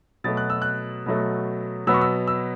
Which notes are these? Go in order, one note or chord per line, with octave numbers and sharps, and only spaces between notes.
B2 F#3 A3 A6
F#6
E6
F#6
B2 F#3 A3
B2 F#3 B3 E6
C#6
E6
E6